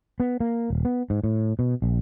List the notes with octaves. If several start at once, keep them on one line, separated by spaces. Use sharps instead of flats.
B3
A#3
D#1
B3
G#2
A2
B2
A#1